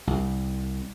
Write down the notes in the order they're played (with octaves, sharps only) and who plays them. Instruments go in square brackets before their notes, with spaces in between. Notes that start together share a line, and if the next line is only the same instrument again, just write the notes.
[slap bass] C2